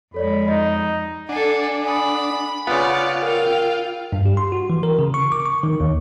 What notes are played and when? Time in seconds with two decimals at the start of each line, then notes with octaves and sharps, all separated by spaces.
0.14 F2 G#3 A4 C#5 D5 B5
0.48 D#4 D#5
1.29 D4 A4 F#5 G#5 C7
1.85 F#5 G#5 B5 D#6
2.67 C#3 B3 F4 D5 F5 F#5 C6
3.22 A#4 F5 G5
4.13 G2
4.26 G4
4.37 C6
4.52 F#4
4.70 E3
4.83 A#4
4.99 C#3
5.14 C#6
5.32 D6
5.46 C#6
5.63 D#3
5.80 D#2